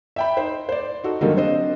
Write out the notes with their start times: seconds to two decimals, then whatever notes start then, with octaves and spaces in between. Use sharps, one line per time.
0.16 E5 G5 B5
0.37 D#4 C5
0.69 C5 D5
1.04 D#4 F#4 A4
1.21 D3 D#3 F#3 G3 A#3 A4
1.36 C4 D4 C5 D#5